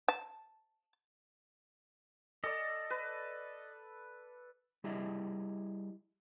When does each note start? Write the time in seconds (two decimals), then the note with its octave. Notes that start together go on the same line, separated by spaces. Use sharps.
0.08 A5
2.44 A4 D5 D#5
2.90 B4
4.84 G3 E4 G4 G#4 D#5 E5